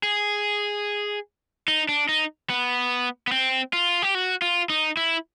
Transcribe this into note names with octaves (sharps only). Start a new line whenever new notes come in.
G#4
D#4
D4
D#4
B3
B3
C4
F4
G4
F#4
F4
D#4
E4